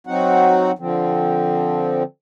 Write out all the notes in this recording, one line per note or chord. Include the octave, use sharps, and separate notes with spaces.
F#3 C4 D#4 F#4 F#5
D3 F3 C4